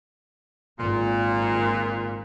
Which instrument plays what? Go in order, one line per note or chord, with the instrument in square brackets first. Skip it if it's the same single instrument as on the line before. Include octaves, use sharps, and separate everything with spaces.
[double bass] G#1 [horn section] A#2